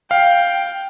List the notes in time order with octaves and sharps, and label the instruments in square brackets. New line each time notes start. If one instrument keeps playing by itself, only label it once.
[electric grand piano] F5 [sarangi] G5